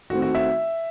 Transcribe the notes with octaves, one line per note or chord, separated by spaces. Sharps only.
D#3 A3 C4 F#4
F#4
E5